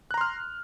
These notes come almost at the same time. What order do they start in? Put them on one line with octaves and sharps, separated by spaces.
F#6 A#5 C6 F6